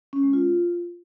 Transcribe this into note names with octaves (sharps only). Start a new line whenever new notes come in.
C#4
G#3
F4